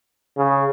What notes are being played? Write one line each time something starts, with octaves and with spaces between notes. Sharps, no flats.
C#3